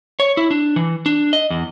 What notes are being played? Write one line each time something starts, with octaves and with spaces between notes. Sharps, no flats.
C#5
E4
D4
E3
D4
D#5
E2